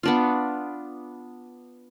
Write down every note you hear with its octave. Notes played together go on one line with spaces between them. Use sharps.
B3 D4 F4